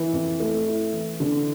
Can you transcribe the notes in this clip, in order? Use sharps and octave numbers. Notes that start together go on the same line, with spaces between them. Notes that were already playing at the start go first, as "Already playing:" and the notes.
Already playing: E3 E4
F2
A3
E4
E3
D3